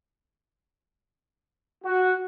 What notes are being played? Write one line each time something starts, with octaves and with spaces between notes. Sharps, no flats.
F#4